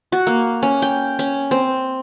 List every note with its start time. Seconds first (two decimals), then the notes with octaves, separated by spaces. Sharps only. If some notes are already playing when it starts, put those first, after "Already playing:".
0.12 F#4
0.27 A#3
0.63 C#4
0.82 G5
1.19 C#4
1.51 C4